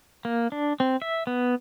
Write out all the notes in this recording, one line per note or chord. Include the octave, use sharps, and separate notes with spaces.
A#3
D4
C4
E5
B3